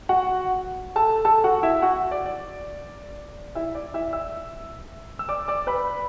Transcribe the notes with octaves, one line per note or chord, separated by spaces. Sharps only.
F#4 F#5
A4 A5
A4 A5
F#4 F#5
E4 E5
F#4 F#5
D5
D5
E4 E5
D5
E4 E5
E5 E6
E6
D5 D6
D5 D6
B4 B5